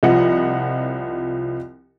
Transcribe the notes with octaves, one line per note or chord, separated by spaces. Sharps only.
C2 F3 D#5 F#5